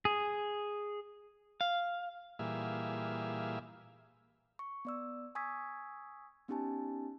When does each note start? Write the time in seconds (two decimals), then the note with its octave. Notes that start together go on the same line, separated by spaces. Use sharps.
0.05 G#4
1.61 F5
2.39 A#2 E3 G3 G#4 E5 F5
4.59 C#6
4.85 B3 D5 E6
5.35 G#5 C#6 D#6 E6 G#6 B6
6.48 B3 C#4 D#4 G4 G#5 A5